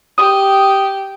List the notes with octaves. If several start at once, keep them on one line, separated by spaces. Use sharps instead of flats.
G4 D#6